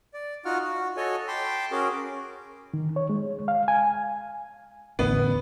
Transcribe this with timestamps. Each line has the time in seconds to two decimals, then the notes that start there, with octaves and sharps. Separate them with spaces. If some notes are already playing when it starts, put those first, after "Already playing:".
0.14 D5
0.45 D#4 F4 F#4 F#5 F6
0.63 F#4
0.97 F#4 A4 C#5 D#5 G#5
1.28 G5 A5 B5 C6 D6
1.72 C#4 F#4 G#4 A#4 D6
2.74 D#3
2.96 C#5
3.09 G#3
3.48 F5
3.68 G#5
4.99 A1 E2 D3 B3